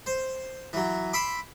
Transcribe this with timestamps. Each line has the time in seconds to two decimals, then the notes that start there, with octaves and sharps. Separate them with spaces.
0.06 C5
0.73 E3 F#3
1.13 E5 B5 C6 D6